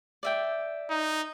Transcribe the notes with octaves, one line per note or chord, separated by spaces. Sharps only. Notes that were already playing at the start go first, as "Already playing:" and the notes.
D5 E5 G5
D#4